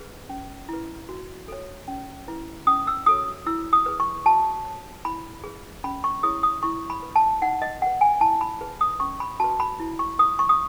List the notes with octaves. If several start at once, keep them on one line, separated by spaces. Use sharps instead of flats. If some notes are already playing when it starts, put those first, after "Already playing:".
Already playing: G#4 B4
C#4
E4 B4
F#4
A4 C#5
C#4
E4 B4
C#4 D#6
E6
F#4 A4 C#5 D#6
E4 E6
D#6
G#4 B4
C#6
F#4 A5
C#5
E4 B5
G#4 B4
C#4 B5
C#6
E4 G#4 C#5 D#6
D#6
E4 C#6
B5
B4
A5
D#4 F#5
D#5
G#4 F#5
B4
G#5
E4 A5
B5
G#4 B4
D#6
C#4 C#6
B5
F#4 B4 A5
B5
E4
C#6
B4 D#6
C#6
D#6